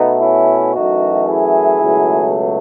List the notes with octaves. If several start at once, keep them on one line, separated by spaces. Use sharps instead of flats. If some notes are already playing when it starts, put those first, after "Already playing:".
Already playing: B2 A3 B3 D#4
C#4 E4
F#2 E3 A3 D#4 F#4
E4 G#4
C#2 B2 F#3 A3